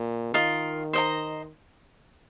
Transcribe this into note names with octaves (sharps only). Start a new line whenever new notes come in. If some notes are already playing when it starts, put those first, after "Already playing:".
Already playing: A#2
D#3 F4 A#4 D#5
C5 D#5 A#5